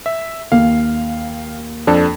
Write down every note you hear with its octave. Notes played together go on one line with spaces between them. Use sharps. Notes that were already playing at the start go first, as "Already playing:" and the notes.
E5
D#2 F5
F2 D4 A4